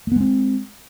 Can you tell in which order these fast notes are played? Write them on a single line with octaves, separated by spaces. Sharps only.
A3 B3 G#3 C4